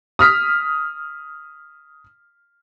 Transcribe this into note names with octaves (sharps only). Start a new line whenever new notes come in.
D#6 F6 B6